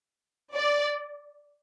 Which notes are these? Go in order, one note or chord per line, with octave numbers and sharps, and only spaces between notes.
D5